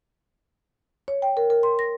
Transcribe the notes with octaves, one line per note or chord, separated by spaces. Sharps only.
C#5
G5
A#4
A#4
C6
A#6